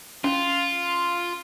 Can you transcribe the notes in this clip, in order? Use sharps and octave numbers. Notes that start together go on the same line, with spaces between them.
C#4 F4